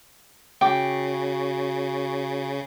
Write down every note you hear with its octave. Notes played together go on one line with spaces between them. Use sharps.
C#3 F#4 G5 D6